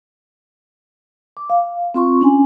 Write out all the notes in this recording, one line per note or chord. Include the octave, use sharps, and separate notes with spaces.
D6
F5
C4 F4 C6 C#6
C#4 D4 G#5